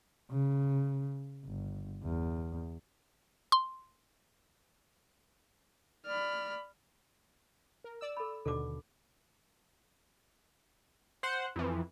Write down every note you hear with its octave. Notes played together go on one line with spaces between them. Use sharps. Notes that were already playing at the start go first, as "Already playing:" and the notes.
C#3
G1
E2
C6
D5 B5 F6
A#4
D5 E6
A4 B5
D#2 B2 D3 A4 D6
C5 F#5
F2 E3